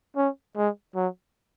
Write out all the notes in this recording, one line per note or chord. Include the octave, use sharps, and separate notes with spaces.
C#4
G#3
F#3